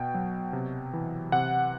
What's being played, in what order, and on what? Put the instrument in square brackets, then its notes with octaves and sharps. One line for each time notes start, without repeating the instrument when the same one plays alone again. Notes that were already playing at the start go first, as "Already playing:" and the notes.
Already playing: [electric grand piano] B2 G5
F#3
C3
E3
C3 F#5